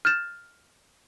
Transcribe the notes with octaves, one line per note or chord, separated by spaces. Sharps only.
F6 G6 A6 E7